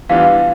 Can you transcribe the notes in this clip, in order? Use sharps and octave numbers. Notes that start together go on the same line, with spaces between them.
E3 G3 B3 D4 F4 F5